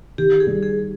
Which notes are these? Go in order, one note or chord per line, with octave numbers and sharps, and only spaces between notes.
D#3 G4
G#4
G3
G#4